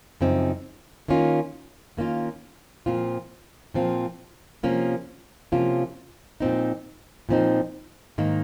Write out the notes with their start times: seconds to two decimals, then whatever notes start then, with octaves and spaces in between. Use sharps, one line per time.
0.21 F#2 C#3 F3 C4 D#4
1.08 D#3 A#3 C#4 F4
1.97 D#3 A#3 C#4 F4
2.86 A#2 F3 C4 F4
3.74 A#2 F3 C4 F4
4.63 C3 F3 A#3 C#4 F4
5.52 C3 F3 A#3 C#4 F4
6.40 A#2 F3 C4 D#4
7.29 A#2 F3 C4 D#4
8.18 G#2 D#3 A#3